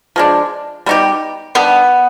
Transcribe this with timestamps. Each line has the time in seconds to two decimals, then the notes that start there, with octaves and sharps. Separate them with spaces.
0.16 F3 G#3 D4
0.86 G3 B3 D#4 G4
1.55 D#3 G3 B3 D4